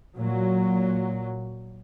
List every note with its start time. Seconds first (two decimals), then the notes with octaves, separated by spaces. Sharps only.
0.16 A#2 F#3